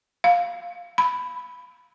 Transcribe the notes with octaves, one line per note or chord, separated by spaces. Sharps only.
F5
B5